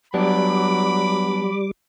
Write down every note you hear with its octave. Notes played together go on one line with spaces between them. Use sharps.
F#3 G3 B3 D4 B5 D6